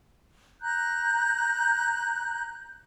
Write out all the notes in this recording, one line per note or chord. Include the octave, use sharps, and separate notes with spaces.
A#5 F#6 G6